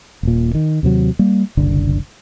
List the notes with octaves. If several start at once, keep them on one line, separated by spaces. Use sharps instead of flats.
D#1 A#2
D#3
D#2 C3 F#3
G3 A#3
F#1 C2 D3